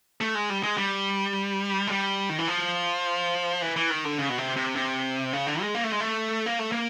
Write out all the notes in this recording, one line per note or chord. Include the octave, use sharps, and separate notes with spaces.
A3
G#3
G3
G#3
G3
G#3
G3
D#3
E3
F3
E3
E3
D#3
D3
C#3
B2
C3
C3
C3
C#3
D3
G#3
A#3
A3
G#3
A3
A#3
A3
A#3